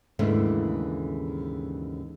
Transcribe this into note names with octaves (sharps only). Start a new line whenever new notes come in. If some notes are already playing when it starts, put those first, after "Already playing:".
D#2 G#2 C#3 E3 A3 D4